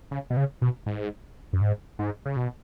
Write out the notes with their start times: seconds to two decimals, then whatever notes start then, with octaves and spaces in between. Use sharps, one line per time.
0.11 C#3
0.30 B2
0.37 C#3
0.62 B2
0.86 G#2
1.53 F#2
1.61 G#2
1.99 G#2
2.26 C#3
2.36 B2